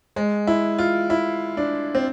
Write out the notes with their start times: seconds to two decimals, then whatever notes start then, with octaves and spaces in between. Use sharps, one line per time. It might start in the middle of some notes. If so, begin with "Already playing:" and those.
0.16 G#3
0.47 E4
0.78 F4
1.10 E4
1.57 D4
1.95 C4